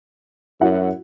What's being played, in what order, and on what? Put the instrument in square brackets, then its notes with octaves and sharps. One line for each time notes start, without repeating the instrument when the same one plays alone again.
[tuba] F#2 [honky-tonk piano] E4 F#4 F#5